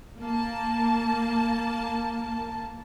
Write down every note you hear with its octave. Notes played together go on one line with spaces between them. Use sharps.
A#3 A5